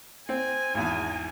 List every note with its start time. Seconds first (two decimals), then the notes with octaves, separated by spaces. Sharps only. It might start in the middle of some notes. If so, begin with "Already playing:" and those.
0.29 C4 G#5
0.74 G#1 E2